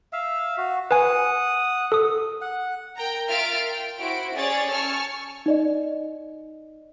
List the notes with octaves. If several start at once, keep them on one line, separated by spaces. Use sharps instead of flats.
E5 F5
F#4
B4 F#5 G#5 D#6
A4 D#6
F#5
A#4 G5 A#5
F4 A#4 E5 F6 A6 D7
G5
E4 F#4 C5 D7
C#4 G#4 C#5 D5 A6
G#5 A5 C#6 E6 F6
D#4 D5 D#5